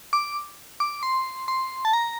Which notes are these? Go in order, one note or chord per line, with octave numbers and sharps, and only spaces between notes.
D6
D6
C6
C6
A5
A#5